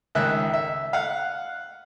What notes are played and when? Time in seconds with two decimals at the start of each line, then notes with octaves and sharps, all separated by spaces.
0.15 C#2 D#3 E5 F#6
0.54 E5
0.93 F5 F#5